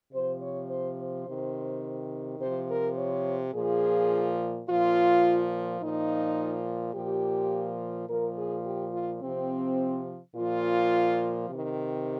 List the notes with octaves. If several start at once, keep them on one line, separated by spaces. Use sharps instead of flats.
C3 F3 C5
C#5
C5
C5
C3 D#3
C3 F3 C5
A#4
C#5
A#2 F3 G#4
A#2 F3 F4
A#2 F3 D#4
A#2 F3 G4
A#2 F3 A#4
G#4
G4
F4
C3 F3 C4
A#2 F3 F4
C3 D#3